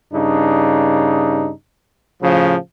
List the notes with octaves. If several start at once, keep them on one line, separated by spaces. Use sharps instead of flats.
G2 C#3 D4 D#4
A2 C#3 F3